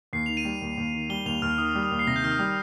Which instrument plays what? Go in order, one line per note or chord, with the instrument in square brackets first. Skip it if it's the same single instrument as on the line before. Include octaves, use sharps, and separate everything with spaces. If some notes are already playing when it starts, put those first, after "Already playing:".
[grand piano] D#2 [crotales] C7
[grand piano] D#3 [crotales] F7
[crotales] D#7
[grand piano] G3
D#2
D#2
D#3
[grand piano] G3 [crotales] G7
[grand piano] D#2 [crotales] F7
[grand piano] D#2 [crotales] F6
[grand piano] D#3 [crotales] D#6
[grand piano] G3
[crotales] D#6
[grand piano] D#2
[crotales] C7
[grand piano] C3 [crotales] A#6
[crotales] G6
[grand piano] D#3 [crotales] F6
[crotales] D#6
[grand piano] G3